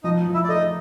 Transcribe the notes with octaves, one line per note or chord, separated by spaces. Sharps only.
F3 D#4 D#5
F3
E4 E5
D5
A3 D#4 D#5